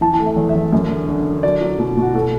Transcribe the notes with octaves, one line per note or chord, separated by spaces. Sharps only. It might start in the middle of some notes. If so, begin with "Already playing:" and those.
E3 A5
A5
A3
E5
E2
E5
E2
F#2
D3
D3
D3
F#3 D5
F#3
B2
B2 F#4
B2 A4